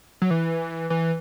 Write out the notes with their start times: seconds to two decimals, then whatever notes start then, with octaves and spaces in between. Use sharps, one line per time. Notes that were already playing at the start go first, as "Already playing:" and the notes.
0.22 F#3
0.31 E3
0.90 E3